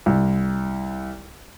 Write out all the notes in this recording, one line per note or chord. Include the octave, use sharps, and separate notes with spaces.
C2